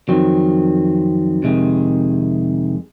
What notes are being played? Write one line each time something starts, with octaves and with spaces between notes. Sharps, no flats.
F2 D#3 F#3 C4
F2 C3 D#3 G#3